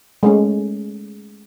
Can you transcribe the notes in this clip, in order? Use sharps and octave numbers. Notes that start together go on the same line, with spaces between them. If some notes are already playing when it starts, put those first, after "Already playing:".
G#3 A3 C#4